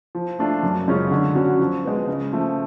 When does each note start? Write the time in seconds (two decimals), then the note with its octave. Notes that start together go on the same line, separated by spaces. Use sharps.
0.15 F3
0.39 A3 D4 F4
0.63 F#2
0.88 C#3 G#3 C#4 F4
1.11 D3
1.35 F#3 C#4 F#4
1.60 F3
1.84 G#3 B3
2.08 C#3
2.33 F3 A3